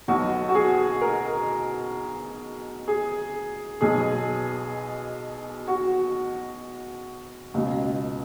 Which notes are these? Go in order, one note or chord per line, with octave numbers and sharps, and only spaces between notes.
B1 B2 F#4
F#4
G#4
A#4
G#4
B1 B2 G#4
F#4
C#2 B2